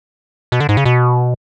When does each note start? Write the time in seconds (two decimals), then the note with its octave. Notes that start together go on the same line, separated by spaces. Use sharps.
0.52 B2
0.60 D3
0.69 G#2
0.77 C#3
0.85 B2